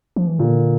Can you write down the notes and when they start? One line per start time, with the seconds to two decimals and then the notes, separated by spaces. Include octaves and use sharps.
0.16 F3
0.27 E3
0.39 A#2 D3